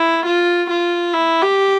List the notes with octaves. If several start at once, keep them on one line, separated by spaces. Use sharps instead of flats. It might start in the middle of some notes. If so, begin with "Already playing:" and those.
Already playing: E4
F4
F4
E4
G4